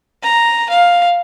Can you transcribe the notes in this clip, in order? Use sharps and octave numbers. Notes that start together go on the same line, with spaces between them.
A#5
F5